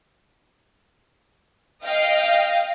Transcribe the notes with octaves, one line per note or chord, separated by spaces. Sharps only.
D#5 F5 G5